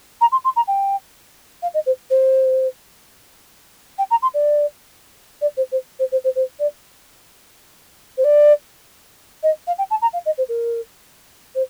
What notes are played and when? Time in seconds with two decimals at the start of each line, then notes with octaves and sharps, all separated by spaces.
0.21 A#5
0.32 C6
0.44 C6
0.56 A#5
0.67 G5
1.62 F5
1.74 D#5
1.86 C5
2.10 C5
3.98 G5
4.10 A#5
4.22 C6
4.34 D5
5.41 D5
5.57 C5
5.71 C5
5.99 C5
6.12 C5
6.24 C5
6.35 C5
6.59 D5
8.17 C5
8.24 D5
9.43 D#5
9.67 F5
9.78 G5
9.90 A5
10.01 A#5
10.13 F5
10.25 D#5
10.38 C5
10.48 A#4
11.55 C5